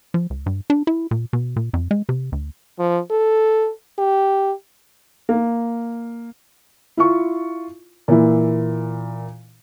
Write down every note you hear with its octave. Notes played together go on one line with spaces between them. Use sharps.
F3
C#2
G2
D4
E4
A#2
B2
A#2
F2
G#3
C3
D2
F3
A4
G4
A#3
E4 F4 C#6
A#2 E3 E4